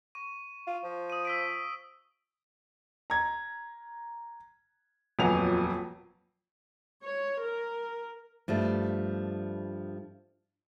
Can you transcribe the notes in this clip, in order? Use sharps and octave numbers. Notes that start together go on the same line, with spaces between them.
C#6 D#7
F4
F3
D#6 D#7
E6 B6 D7
A#5 G#6
D#1 F2 F#3 B3 G#5 F7
C#5
A#4
G2 F3 G3 A3